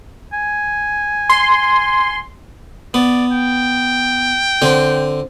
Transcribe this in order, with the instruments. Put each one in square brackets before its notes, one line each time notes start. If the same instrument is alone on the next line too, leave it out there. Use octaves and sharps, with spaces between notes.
[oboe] G#5
[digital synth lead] C6
[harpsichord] B3 [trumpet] D5
[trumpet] G5
[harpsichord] D3 C4